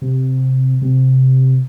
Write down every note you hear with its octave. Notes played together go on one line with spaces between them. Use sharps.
C3
C3